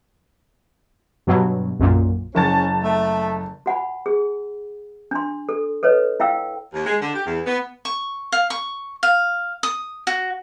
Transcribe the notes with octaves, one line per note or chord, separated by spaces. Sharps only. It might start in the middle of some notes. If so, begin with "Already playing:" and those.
G2 B2 F#3
B1 F#2 A#2
F#1 C#4 A5 A6
A3
F#4 F#5 G#5 B5
G#4
D4 C6
A4
A4 B4 C#5 D#5
E4 F5 G5 E6
D#2
G#3
D3
G4
E2
B3
C#6
F5
C#6
F5
D#6
F#4